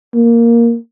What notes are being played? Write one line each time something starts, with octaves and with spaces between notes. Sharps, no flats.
A#3